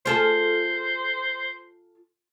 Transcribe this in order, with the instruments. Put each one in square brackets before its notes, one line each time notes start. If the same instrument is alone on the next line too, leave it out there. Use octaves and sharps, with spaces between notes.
[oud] F4 G#4 A4 [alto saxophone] C5